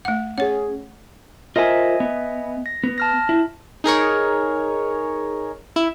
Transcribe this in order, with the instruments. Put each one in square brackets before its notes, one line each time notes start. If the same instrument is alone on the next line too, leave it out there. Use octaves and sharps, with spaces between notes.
[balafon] A3 F#5
[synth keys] C#4 G#4 [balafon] C#5 F#5
[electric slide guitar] F4 A#4 C5 [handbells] D#5 E5 G#5
[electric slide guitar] B3
[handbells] A#6
[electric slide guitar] B3
[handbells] A5 F6 A#6
[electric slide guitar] E4
[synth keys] D#4 G#4 A#4 C#5
E4